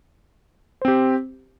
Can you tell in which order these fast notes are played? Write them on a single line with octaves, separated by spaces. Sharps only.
C5 C4 G4